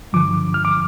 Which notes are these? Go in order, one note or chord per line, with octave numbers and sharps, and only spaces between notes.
G2 D3 F3 D6
F6
D6